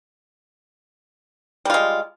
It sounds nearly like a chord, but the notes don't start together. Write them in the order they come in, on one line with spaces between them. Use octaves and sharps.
G3 F4 G#3